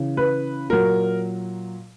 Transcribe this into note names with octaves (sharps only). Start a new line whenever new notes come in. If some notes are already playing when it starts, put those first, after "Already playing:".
Already playing: C#3 E3
B4
A#2 F#3 A#4